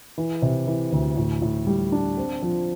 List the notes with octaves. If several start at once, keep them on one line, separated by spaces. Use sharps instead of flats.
E3
C3
E3
D2
A2
A2
G3
D4
C4
F3